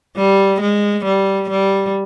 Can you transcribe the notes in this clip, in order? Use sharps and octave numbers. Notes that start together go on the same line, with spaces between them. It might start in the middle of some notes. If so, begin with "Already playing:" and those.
G3
G#3
G3
G3